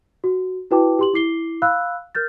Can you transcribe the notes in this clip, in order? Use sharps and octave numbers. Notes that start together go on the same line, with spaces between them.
F#4
E4 F#4 B4 G5 A5 D6
G4 C6 F#7
E4 D6 C7 G7
F5 B5 E6 F#6
A#4 F6 G6 A6